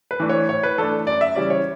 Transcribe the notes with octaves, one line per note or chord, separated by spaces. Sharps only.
B4
E3 A3 D4
C#5
A2 C#5
B4
E3 A3 D4 A4
F#2 D5
E5
C#3 E3 G3 C#4 D5
C#5